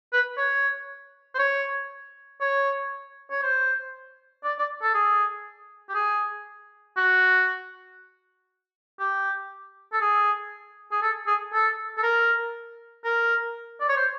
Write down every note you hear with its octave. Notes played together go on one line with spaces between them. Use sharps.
B4
C#5
C5
C#5
C#5
C#5
C5
D5
D5
A4
G#4
G4
G#4
F#4
G4
A4
G#4
G#4
A4
G#4
A4
A4
A#4
A#4
D5
C#5
C5